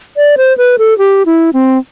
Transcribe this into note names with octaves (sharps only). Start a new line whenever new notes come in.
D5
C5
B4
A4
G4
E4
C4